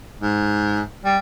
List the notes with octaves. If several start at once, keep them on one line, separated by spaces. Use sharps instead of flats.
G#2
G3